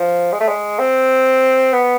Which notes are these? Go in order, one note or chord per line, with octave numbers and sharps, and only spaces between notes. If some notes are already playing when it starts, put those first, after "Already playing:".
Already playing: F3
G#3
A3
G#3
C4
B3